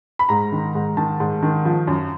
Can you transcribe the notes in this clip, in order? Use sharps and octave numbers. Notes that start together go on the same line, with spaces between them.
B5
G#2 A#5
D#3
G#2
D#3 A5
G#2
D#3
F3
F#2